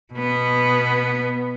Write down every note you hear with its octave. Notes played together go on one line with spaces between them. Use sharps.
B2 B3